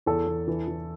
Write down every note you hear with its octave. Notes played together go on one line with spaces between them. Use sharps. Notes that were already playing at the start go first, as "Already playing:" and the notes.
E2 A4
E2
E3
E3